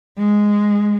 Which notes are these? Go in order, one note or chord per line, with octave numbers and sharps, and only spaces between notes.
G#3